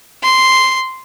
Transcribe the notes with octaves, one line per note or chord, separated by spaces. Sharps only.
C6